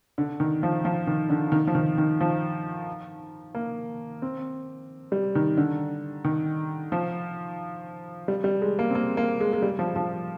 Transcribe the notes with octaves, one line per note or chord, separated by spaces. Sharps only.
D3
D#3
F3
F3
D#3
D3
D#3
F3
D#3
D#3
F3
A#3
C4
G3
D#3
D3
D#3
F3
G3
G3
G#3
A#3
C4
A#3
A#3
G#3
G#3
G3
F3
F3